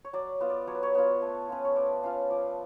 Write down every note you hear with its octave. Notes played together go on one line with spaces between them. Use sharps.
C#5
F#3 D5
B3 F4
D5
F#3 C#5
B4
C#5
B3 F4
A3
C#4 F4 B4
C#5
A3 D5
C#4 F4 F5
F3 D5